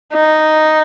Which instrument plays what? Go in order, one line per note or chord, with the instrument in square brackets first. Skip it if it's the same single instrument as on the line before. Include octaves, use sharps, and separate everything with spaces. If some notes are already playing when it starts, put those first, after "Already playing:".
[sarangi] D#4